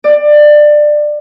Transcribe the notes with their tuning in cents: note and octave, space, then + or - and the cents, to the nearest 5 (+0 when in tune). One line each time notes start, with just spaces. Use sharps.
D5 +20